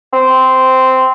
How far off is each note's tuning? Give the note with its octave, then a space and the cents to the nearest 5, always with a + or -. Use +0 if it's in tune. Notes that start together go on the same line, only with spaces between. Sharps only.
C4 -10